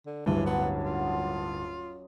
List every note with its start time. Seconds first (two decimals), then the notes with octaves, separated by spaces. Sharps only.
0.06 D3
0.26 D1 G2 E3 C#4 F4
0.46 F#3 B3
0.84 F#2 F4 F#4
1.05 D#5 C6 D6